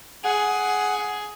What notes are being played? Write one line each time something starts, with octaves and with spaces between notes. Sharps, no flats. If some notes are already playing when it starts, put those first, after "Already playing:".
G#4 F#5